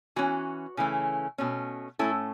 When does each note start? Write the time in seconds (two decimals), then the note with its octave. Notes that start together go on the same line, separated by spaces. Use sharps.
0.16 E3 C#4 F#4
0.77 C#3 E3 A3 C#4
1.38 B2 A3 C#4
1.99 A2 A3 C#4 E4 A4